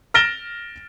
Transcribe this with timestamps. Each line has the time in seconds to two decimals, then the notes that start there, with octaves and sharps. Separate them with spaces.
0.14 F6 A6 A#6 D7 E7 G7